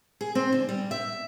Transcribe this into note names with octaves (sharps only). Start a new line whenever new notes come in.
G#4
C4
D3
G3
E5